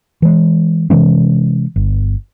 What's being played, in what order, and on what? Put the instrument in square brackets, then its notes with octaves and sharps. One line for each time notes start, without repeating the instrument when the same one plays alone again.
[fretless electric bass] E3 G#3
C3 E3 G#3 C#4
G1